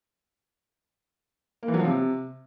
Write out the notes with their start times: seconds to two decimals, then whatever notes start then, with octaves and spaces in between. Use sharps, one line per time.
1.63 A#3
1.68 E3
1.74 F#3
1.79 F3
1.85 C3